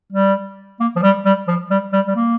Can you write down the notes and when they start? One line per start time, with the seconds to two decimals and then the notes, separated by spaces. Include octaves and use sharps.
0.12 G3
0.80 A#3
0.96 F3
1.03 G3
1.25 G3
1.48 F3
1.71 G3
1.93 G3
2.07 G3
2.16 A#3